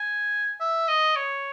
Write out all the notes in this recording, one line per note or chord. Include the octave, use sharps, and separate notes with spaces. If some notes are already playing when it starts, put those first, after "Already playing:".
Already playing: G#5
E5
D#5
C#5